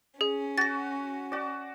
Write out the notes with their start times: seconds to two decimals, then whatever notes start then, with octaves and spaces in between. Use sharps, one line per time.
0.21 C#4 G#4
0.58 F#4 A6 A#6
1.32 F#4 D5